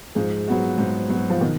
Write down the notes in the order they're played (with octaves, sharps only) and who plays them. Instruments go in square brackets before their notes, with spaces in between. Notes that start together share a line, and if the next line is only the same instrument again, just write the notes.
[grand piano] G#2 [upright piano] F3 G#3
[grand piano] F#3 B3 F#4
G#2
F#3 B3 F#4
[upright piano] F3
[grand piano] B2 [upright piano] D#3